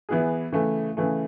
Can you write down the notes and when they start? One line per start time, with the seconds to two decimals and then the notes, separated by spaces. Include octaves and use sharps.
0.09 E3 B3 E4 G#4
0.52 C#3 E3 A3
0.97 C#3 E3 A3